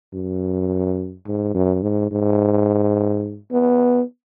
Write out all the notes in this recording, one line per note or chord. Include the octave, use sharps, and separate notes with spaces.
F#2
G#2
F#2
G#2
G#2
B3